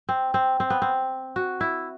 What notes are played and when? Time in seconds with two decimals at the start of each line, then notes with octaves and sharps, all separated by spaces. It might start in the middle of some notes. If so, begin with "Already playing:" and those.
0.09 C4
0.34 C4
0.60 C4
0.70 B3
0.82 C4
1.36 F#4
1.61 E4